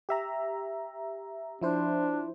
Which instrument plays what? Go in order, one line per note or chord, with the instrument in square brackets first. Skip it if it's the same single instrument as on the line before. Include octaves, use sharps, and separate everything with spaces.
[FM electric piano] G4 E5 A#5
[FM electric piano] F3 E4 C5 [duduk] D4